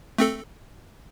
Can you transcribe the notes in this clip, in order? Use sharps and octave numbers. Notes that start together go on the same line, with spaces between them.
A3 C4 A4